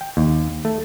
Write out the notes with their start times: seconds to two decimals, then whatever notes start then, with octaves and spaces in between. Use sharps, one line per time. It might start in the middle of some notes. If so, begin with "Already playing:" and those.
0.01 G5
0.17 D#2
0.65 A3